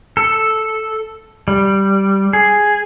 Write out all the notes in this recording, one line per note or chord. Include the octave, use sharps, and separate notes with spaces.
A4
G3
G#4